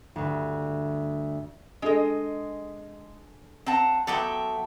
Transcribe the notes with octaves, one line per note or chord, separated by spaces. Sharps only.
D2 G2
G#3 D4 G#4 A4 D#5
C4 F#5 A5 A#5
F#3 B3 A4 E5 G5 C6 D6